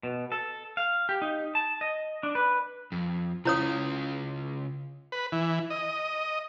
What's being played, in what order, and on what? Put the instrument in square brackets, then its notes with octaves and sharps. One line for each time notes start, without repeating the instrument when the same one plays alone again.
[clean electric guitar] B2
A4
F5
G4
D#4
A5
D#5
D4
B4
[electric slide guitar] F2
[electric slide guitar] C#3 C#4 F4 [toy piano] E4 C#5 D#6
[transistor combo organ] B4
E3
D#5